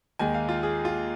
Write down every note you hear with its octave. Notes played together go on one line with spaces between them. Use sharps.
D#2 D#3 G#3 G#5
F5
F4
G#4
F4